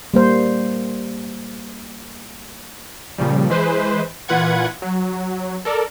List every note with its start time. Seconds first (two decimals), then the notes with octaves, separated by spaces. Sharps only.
0.14 G3 A#3 C5
3.18 A#2 C#3 F3 G3
3.50 E3 G#3 B4 C5
4.28 A#2 E3 F4 B4 F#5 G#6
4.82 F#3
5.65 A4 A#4 D5